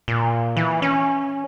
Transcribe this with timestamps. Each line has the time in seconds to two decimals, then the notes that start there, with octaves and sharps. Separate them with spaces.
0.08 A#2
0.56 E3
0.82 C#4